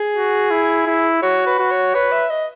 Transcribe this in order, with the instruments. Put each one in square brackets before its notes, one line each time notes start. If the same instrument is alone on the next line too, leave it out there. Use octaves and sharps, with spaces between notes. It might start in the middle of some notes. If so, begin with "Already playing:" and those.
Already playing: [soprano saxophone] G#4
[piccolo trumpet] F#4
E4
E4
[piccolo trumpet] F#4 [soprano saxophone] C#5
[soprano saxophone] B4
[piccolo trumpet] F#4
[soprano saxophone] C#5
[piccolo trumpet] B4 [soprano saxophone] C#5
[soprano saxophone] E5
D#5